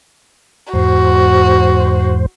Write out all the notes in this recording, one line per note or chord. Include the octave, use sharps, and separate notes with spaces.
E2 G#2 F#4 C5